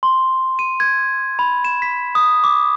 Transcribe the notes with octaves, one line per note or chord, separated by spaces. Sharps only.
C6
D#7
G#6
B5
E7
B6
D#6
D6